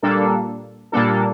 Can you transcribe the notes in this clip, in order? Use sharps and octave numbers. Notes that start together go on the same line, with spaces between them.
A#2 G3 A#3 D4 A4
A#2 G3 A#3 D4 A4